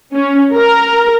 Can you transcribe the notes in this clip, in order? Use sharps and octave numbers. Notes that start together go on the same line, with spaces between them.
C#4
A#4